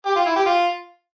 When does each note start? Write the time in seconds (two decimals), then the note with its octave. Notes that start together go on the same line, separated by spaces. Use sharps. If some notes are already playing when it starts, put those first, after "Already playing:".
0.06 G4
0.16 F4
0.26 E4
0.36 G4
0.46 F4